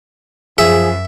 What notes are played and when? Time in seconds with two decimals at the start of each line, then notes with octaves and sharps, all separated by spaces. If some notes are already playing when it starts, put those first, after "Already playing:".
0.58 F#2 F3 G#4 E5